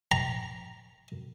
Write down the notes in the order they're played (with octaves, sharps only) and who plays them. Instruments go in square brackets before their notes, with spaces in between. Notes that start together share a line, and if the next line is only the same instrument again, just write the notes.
[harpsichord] A#5